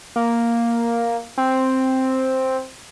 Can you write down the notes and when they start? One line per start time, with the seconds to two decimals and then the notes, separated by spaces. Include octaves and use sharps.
0.16 A#3
1.38 C4